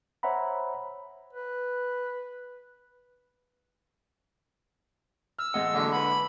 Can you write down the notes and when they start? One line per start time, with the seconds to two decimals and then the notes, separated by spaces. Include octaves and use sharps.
0.23 C5 C#5 E5 F#5 A#5 B5
1.33 B4
5.39 E6 F6
5.54 A1 G#3 D#5 F#5
5.74 D3 F#3 A#3
5.91 C#2 B4 B5